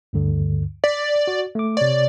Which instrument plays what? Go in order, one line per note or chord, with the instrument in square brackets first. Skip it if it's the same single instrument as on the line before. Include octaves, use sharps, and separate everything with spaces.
[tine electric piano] D2 G2 D3
[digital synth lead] D5 [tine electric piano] D6 B6
[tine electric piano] F#4
A3 D6
[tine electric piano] C3 C#5 [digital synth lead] D5